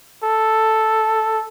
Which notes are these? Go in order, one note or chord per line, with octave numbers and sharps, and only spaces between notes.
A4